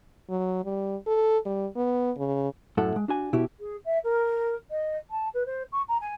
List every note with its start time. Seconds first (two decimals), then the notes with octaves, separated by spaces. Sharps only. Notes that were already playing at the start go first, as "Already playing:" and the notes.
0.29 F#3
0.65 G3
1.07 A4
1.45 G3
1.76 B3
2.17 C#3
2.77 F#2 A2 E4 A4 F#5
2.96 G#3
3.08 D4 F#4 G#5
3.33 B2 E4 G4
3.59 G#4
3.84 E5
4.03 A#4
4.70 D#5
5.10 A5
5.33 B4
5.45 C5
5.72 C#6
5.88 A#5
6.00 G#5